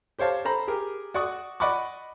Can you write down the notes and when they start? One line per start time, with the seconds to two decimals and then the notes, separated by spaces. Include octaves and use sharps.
0.19 G4 C5 C#5 F5 A5
0.45 A4 C5 A#5 B5
0.68 G4 G#4 A#4
1.14 F#4 D5 F#5 C#6 D#6
1.60 D5 D#5 F#5 B5 C#6 D6